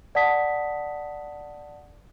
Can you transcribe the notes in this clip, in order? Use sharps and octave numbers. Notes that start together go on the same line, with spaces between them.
D5 F#5 A5 D#6 B6